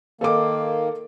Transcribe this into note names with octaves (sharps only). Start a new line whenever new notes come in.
D#3 A#3 A4 A#4 D6